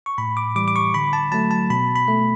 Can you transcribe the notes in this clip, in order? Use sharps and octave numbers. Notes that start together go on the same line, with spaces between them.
C#6
A2 B5
D6
E3 G3 D6
D6
C#6
D3 B5
A5
F#3 A3 A5
A5
B2 B5
B5
A3